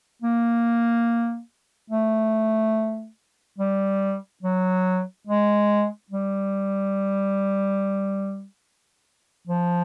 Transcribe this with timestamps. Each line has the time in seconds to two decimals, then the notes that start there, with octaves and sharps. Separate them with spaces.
0.22 A#3
1.90 A3
3.58 G3
4.43 F#3
5.27 G#3
6.10 G3
9.47 F3